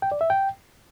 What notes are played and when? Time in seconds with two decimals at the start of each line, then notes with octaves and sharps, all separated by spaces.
0.02 G5
0.12 D5
0.21 E5
0.30 G5